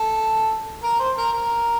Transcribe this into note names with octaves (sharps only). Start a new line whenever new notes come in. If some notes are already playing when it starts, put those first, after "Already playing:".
Already playing: A4
A#4
C5
A#4
A#4